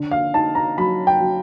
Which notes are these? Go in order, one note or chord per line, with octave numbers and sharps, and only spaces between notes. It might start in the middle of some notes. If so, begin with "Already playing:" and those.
Already playing: D3
F5
D#4 A5
A#5
F#3 B5
G5
F#3